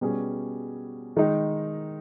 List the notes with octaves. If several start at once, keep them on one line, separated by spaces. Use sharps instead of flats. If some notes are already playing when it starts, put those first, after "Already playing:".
B2 G3 C#4 G#4
D#3 G#3 D#4